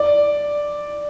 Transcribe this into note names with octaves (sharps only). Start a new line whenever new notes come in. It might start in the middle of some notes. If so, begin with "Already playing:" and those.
Already playing: D5